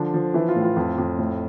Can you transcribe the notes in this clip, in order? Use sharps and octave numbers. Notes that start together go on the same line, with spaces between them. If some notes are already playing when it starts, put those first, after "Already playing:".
Already playing: D3 F3 D4
F3
E3 E4
F4
A2
F4
F2
F2
A2